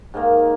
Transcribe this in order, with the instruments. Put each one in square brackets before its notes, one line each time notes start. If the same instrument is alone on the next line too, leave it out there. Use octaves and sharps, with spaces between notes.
[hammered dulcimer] G#2 D#3 A#3